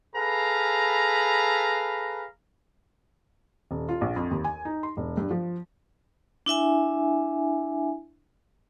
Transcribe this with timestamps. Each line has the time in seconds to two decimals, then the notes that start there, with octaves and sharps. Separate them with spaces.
0.16 G#4 A4 B4 F5 A#5 B5
3.71 D#1
3.89 F4
4.01 A#1
4.16 F2
4.31 D#2
4.44 G#5
4.65 D#4
4.83 C6
4.97 E1
5.17 G2
5.31 F3
6.46 D4 E4 E5 G#5